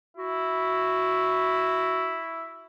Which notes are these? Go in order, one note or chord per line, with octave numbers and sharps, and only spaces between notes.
E4 F#4